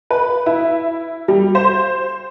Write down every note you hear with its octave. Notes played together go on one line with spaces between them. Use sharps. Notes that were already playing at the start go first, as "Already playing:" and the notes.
B4
E4
G3
C5